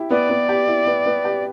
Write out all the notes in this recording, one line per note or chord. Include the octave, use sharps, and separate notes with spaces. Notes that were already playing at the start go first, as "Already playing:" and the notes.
Already playing: E4 G4
B3 D5
B3
G4
E4
B3
B3
G4